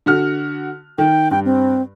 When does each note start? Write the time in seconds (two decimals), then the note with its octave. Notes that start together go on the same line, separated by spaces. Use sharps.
0.06 D3 F#4 F6
0.98 D#3 G5
1.31 G2 G5
1.45 C4